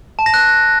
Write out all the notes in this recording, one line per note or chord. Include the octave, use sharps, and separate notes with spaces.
A5
A#6
F#6